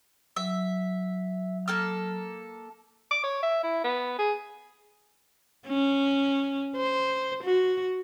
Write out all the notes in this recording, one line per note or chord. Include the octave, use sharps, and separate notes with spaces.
F#3 E5
A#3 A4 F6
D6
C#5
E5
E4
B3
G#4
C#4
C5
F#4